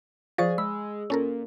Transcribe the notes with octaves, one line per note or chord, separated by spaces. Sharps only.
F3 G#4 C5 D5 F5 C#6 A6
G#3 B5 E6
A#2 C#4 A4 A#4